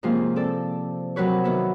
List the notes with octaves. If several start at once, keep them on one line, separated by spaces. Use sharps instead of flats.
G#2 C3 F3 A#3 C#4 F4
C4 A4 D5
C3 F#3 A#4 B4 C#5
D#3 B3 E5